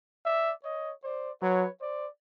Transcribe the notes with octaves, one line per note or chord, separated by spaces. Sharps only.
D5 E5
C#5 D#5
C5 D5
F#3 B4 C#5
C5 D5